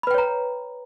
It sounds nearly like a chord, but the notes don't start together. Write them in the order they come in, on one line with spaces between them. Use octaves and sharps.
B5 B4 G5 C#5 A#5